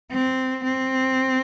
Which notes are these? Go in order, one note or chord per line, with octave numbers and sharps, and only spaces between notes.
C4
C4